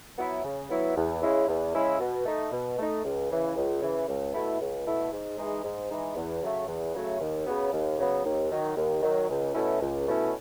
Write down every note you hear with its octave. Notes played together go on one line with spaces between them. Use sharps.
F#3 B3 E4
C#3
F#3 B3 E4
E2
C#3 G#3 C#4 E4
E2
C#3 G#3 C#4 E4
B2
A3 D#4
B2
A3 D#4
C#2
C#3 E3
C#2
C#3 E3
C#2
B2 A3 E4
C#2
B2 A3 E4
G#2
E3 G#3 D#4
G#2
E3 G#3 D#4
E2
C#3 F#3 A3
E2
C#3 F#3 A3
D#2
C#3 F#3 B3
D#2
C#3 F#3 B3
D#2
D#3 F#3
D#2
D#3 F#3
C#2
B2 A3 C#4 E4
C#2
B2 A3 C#4 E4